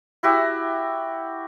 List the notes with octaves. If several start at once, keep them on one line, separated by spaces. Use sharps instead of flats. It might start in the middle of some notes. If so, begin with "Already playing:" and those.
E4 F#4 G4 E5